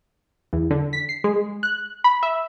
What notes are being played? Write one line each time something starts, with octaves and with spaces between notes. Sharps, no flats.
E2
D3
B6
C7
G#3
F#6
B5
E5